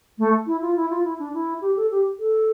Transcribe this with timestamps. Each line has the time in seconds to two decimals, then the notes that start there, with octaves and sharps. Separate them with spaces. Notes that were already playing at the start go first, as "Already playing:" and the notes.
0.19 A3
0.47 E4
0.62 F4
0.76 E4
0.90 F4
1.04 E4
1.19 D4
1.34 E4
1.61 G4
1.77 A4
1.91 G4
2.19 A4